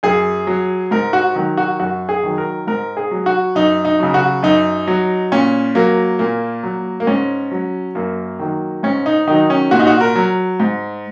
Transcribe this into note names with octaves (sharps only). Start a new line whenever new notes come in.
F#2 G#4
F#3
G#2 A#4
F#4
D#3 F#3
F#4
F#2 F#4
G#4
D#3 F#3
A#4
G#2 A#4
G#4
F#3
F#4
F#2 D#4
D#4
C#3 F#3
F#4
F#2 D#4
F#3
A#2 C#4
F#3 A#3
A#2 A#3
F#3
A#3
G#2 C#4
F#3
F#2 A#3
D#3 F#3
G#2 C#4
D#4
D#3 F#3 D#4
C#4
A#2 F#4
D#4
F#4
A#4
F#3
G#2